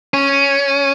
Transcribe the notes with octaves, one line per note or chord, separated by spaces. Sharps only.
C#4